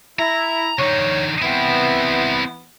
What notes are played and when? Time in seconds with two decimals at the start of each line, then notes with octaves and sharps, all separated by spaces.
0.19 E4 A#5
0.79 D3 D#4 C#5
1.42 E3 B3 C4 E4